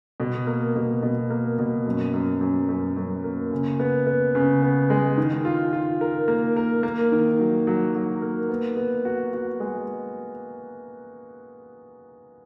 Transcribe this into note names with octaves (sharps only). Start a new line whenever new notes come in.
B2
A#3
B2
B2
A#3
B2
F#2
F#2
F#2
F#2
F#2
A#3
C#3
B3
B3
C#3
B3
G#3
D#3
F4
F4
A#4
A#3
A#4
A#3
D#3
F#3
F#3
F#3
A#3
B3
B3
F#4
F#4
G#3